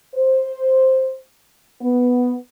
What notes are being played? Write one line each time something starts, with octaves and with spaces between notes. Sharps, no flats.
C5
B3